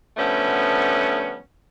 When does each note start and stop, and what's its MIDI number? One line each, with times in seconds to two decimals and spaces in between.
0.17 1.38 50
0.17 1.38 53
0.17 1.38 55
0.17 1.38 57
0.17 1.38 59
0.17 1.38 61